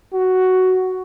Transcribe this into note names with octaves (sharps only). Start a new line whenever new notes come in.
F#4